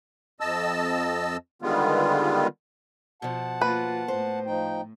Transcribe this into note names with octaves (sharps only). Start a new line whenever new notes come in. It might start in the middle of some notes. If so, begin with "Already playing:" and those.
F2 D#5 A5 E6
D3 D#3 G3 G#3 B3 F4
B2 F3 F#5 A5
A#3 F4 B4
A2 C5
F3 D#4 G5